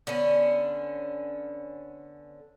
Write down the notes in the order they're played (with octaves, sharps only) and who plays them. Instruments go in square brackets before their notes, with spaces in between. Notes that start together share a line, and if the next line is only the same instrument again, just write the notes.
[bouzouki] D3 B3 C#4